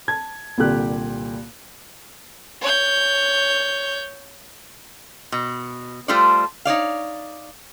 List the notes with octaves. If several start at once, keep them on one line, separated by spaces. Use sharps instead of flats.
A5 G#6
C2 A#2 D3 G4 F#6
C#5 G6
B2
G3 A3 F4 A4 C5 D5
D#4 C#5 D5 F5